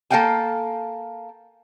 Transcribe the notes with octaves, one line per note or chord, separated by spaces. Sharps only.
A#3 A4 D#5 F5 G5 G#5